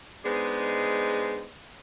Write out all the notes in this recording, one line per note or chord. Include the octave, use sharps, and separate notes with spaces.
G#3 B3 D4 D#4 G#4 C5